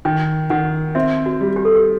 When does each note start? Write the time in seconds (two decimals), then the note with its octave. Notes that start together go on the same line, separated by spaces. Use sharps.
0.05 D#3 G5
0.50 D#3 F#5
0.95 C4 E5
1.26 F#4
1.41 G3
1.56 G4
1.65 A4
1.75 G4